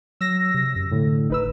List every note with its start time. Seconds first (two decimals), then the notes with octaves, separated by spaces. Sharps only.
0.21 F#3 E6 A#6
0.54 C3
0.76 F#2
0.91 A2 D3
1.30 G#1 D#4 B4 E6